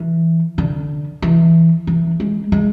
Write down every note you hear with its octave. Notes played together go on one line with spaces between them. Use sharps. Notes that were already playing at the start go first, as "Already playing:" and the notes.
Already playing: E3
D3
E3
E3
G#3
G#3